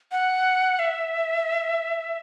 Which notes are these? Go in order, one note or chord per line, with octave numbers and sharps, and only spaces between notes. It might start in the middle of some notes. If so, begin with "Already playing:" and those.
F#5
E5